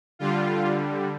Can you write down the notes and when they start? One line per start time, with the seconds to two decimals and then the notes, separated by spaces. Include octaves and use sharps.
0.19 D3 G3 F4